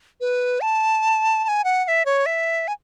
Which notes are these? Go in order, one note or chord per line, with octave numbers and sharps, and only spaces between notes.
B4
A5
A5
G#5
F#5
F#5
E5
C#5
E5
G#5